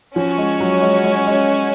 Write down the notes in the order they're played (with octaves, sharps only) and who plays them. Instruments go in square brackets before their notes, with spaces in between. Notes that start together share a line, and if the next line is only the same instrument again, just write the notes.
[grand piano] F3 [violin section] C#4 F#4 C#5 G#5
[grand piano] G#3
F#3
G#3
G#3
G#3